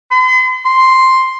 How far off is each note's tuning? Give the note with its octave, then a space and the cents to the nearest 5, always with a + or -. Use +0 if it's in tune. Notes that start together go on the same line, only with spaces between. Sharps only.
C6 -45
C6 +0